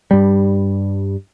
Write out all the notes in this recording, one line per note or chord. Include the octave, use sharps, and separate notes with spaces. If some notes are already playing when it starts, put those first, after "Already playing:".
G2 G3